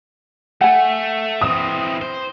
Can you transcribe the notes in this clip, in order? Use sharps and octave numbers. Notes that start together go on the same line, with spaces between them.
A3 F#5 G#5
E3 C4 D#6
C5